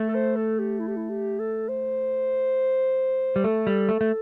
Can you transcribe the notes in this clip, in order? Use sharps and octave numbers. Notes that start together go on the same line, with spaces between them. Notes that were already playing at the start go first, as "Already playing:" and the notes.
Already playing: A3
A4
C5
A4
G4
E4
G4
E4
G4
A4
C5
G3
A3 A4
G3
A3
A3